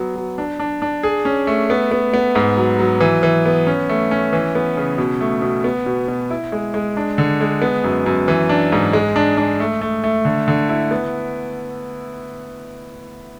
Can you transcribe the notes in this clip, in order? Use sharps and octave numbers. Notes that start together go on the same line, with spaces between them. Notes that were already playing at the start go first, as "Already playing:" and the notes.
Already playing: F#3 B3
F#3
D4
D4
D4
G#4
C#4
A3
B3
B3
B3
G#2
F#3
F#3
E3
E3
B3
C#4
A3
C#4
E3
B3
C#3
B2
A3
B2
B3
B2
B2
E4
G#3
G#3
D4
D3
G#3
B3
F#2
F#2
E3
D4
G#2
G#3
D4
D4
A3
A3
A3
D3
D3
E4
B3